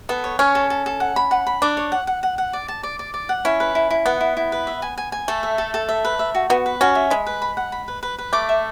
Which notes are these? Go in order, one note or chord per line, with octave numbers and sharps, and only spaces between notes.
B3 A4
C#5
C#4 C#5
A4
A4
A4
F#5
B5
F#5
B5
D4 D6
C#5
F#5
F#5
F#5
F#5
D5
A5
D5
D5
D5
F#5
C#4 E4
B4
E4
E4
B3 F#5
E4
E4
B4
E5
G#5
G#5
G#5
A3 A4
E5
A4
A4
E5
B4
E5
F#4
B3 F#4
B4
C#4 F#4
E5
G#3 B5
B4
B5
F#5
B5
B4
B4
B4
A3 D6
E5